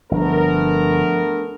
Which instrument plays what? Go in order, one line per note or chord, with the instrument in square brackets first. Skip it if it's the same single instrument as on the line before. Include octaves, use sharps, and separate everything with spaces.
[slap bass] G1 [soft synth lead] F3 [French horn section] A3 B3 A#4 [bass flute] D4